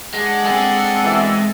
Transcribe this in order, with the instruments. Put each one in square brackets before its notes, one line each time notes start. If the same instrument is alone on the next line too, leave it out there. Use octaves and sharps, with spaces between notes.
[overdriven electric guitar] G#3 [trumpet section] D4 F#5
[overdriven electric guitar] G#3 G#4 [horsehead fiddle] C4 A4
[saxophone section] B2 E3 E4